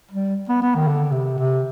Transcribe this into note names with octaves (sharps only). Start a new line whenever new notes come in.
G3
B3
B3
D#3
D3
C3
C3